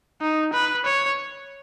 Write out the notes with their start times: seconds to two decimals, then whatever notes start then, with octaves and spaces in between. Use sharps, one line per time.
0.21 D#4
0.53 B4
0.86 C#5